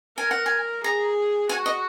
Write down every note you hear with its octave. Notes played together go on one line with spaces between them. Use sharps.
A#4 G#5
F#5
G#5
G#4 A#5
F#4 G#5
D#5